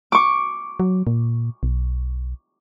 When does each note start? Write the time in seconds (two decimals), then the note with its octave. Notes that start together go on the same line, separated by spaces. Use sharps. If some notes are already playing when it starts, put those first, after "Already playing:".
0.12 C#6 D6
0.80 F#3
1.07 A#2
1.63 B1